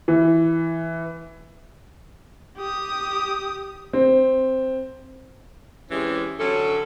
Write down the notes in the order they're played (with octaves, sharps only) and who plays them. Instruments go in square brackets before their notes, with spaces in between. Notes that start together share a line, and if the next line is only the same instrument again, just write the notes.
[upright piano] E3
[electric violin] G4 D#6
[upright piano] C4
[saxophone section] C3 E3 G#3 C#4 G4
D3 F#3 C#4 A4